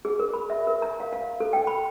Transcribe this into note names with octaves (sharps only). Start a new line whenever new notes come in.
G#4
A#4
B5
E5
A#4
A#5
F5
F5
A4
G5
B5